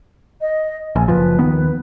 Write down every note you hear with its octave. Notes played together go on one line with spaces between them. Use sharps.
D#5
A#1 G#5
F#1 F3 B4
D#2 D#3 B3